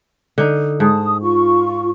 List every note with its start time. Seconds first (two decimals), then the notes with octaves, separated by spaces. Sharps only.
0.38 D3 D#4
0.80 G#2 A5 D#6
1.21 F4 C#6